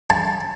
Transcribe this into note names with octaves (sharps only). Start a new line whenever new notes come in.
A5